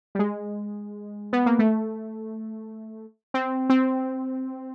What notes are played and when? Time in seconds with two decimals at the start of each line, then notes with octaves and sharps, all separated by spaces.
0.15 G3
0.19 G#3
1.33 B3
1.46 A#3
1.59 A3
3.34 C4
3.70 C4